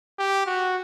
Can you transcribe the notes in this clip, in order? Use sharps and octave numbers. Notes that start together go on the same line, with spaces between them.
G4
F#4